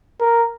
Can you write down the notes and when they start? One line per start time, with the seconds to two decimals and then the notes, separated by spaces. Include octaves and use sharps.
0.21 A#4